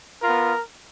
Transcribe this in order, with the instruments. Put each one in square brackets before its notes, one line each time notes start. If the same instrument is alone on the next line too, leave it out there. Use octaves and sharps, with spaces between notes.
[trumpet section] B3 F4 A#4